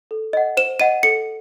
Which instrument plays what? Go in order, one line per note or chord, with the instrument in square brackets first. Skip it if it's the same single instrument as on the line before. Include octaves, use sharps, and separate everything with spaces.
[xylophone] A4
D#5 F#5
C5 E7
D#5 F#5 D#7
A4 C#7